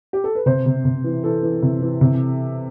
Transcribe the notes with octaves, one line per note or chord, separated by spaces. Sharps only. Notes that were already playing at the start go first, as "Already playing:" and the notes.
G4
A4
B4
C3 C5
C3
C3
E3
E3 A4
E3
C3
E3
C3